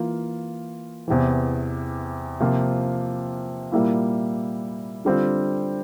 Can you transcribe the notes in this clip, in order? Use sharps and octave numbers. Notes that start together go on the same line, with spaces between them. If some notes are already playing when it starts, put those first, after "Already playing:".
Already playing: E3 A#3 F4
E2 C3 E3
C3 F3 A#3 F4
A#2 G3 A#3 E4
D3 G3 C4 F4